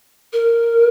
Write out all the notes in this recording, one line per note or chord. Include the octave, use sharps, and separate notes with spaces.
A#4